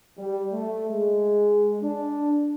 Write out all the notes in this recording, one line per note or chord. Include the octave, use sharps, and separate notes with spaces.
G3
A3
G#3
D4